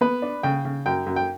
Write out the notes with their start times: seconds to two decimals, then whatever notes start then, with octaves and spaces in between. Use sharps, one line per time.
0.01 B3 B4
0.22 D4
0.43 C#3 G5
0.65 C#3
0.86 F#2 G5
1.06 F#2
1.16 G5